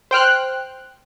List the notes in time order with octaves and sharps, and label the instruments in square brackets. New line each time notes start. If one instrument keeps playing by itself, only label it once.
[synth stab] C5 G5 F6 F#6